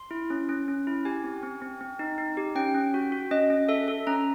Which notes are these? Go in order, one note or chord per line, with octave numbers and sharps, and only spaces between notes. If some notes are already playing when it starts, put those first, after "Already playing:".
Already playing: C6
E4
C#4
C#4
C#4
E4
G4 G#5
C4
C4
C4
C4
D#4
D#4
G4
C#4 G5
C#4
F#4
F#4
C#4 D#5
C#4
A4 E5
A4
C#4 A#5